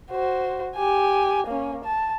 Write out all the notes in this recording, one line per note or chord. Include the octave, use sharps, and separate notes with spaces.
F#4 C5
G4 G#5
A#3 C#4
A5